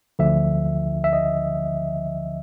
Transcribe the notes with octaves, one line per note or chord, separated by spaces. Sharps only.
D2 D3 F3 E5
E5
D#5